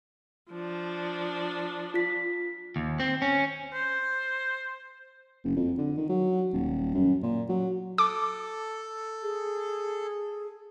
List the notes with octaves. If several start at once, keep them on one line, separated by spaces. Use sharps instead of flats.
F3 D4
F4 B6
D#2
C4
C#4
C5
F#1
F2
D3
D#3
F#3
D#1
F#2
A#2
F#3
A4 D6
G#4